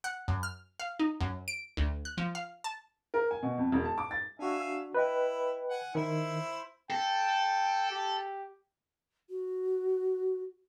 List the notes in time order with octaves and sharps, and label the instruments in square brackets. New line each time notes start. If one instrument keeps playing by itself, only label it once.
[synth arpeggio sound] F#5
F#2
F6
F5
D#4
F#2
D7
D2
F#6
F3
F5
A5
[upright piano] A#4
G#5
B2
F2
E1
A5
D6
A6
[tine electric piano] D4 F#4 [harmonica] E5 F5 G#5
[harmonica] E4 [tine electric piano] B4 D#5 G5
[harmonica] F#5 G#5
[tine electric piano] D#3 [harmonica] E4 C5 E5
[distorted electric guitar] A4 [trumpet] G5
[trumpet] G4
[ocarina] F#4